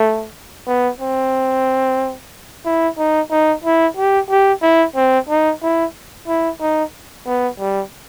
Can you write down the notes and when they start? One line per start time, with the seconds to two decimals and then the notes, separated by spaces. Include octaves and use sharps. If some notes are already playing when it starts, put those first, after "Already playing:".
Already playing: A3
0.67 B3
1.01 C4
2.65 E4
2.98 D#4
3.31 D#4
3.64 E4
3.97 G4
4.30 G4
4.62 E4
4.96 C4
5.29 D#4
5.62 E4
6.27 E4
6.61 D#4
7.26 B3
7.60 G3